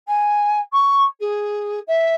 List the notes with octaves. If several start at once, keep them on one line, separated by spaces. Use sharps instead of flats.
G#5
C#6
G#4
E5